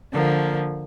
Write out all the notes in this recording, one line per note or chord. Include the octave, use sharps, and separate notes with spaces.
D3 F3 A#3